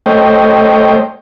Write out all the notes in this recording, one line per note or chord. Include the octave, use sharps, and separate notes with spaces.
A3 C5 C#5 D#5 G5